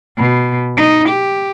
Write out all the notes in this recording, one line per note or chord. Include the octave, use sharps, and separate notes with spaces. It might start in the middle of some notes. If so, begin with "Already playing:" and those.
B2
D#4
G4